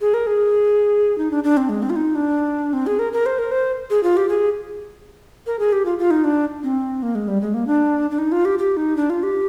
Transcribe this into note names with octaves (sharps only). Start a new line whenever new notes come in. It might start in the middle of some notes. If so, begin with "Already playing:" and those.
G#4
A#4
G#4
D#4
D4
D4
C4
G#3
C4
F4
D#4
D4
C4
G#4
A#4
A#4
C5
A#4
C5
G#4
F4
G4
G#4
A#4
G#4
G4
F4
F4
D#4
D4
C4
A#3
G#3
G3
G#3
A#3
D4
D4
D#4
F4
G4
G4
D#4
D4
F4
G4